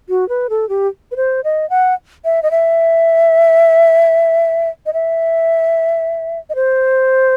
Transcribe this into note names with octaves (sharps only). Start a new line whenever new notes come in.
F#4
B4
A4
G4
B4
C5
D#5
F#5
E5
D#5
E5
D#5
E5
D#5
C5